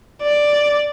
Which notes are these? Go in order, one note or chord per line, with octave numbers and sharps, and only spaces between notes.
D5